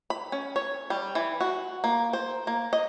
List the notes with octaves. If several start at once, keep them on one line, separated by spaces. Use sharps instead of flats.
B5
C#4
C#5
G3
E3
F#4
A#3
C5
A#3
D#5